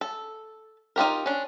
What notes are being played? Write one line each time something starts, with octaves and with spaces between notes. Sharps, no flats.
A4
D#4 F4 G4 A#4
C#4 D4